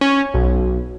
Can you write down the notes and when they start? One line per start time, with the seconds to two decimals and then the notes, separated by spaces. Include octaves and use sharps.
0.01 C#4
0.34 B1